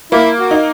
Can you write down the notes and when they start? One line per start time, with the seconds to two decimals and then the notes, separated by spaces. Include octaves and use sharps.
0.12 A#3 E4
0.38 F#4
0.51 D#4